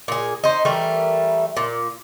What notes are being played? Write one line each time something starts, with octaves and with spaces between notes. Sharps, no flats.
A#2 G#4
D#4 C5
E3 G3 A3 A#4
A#2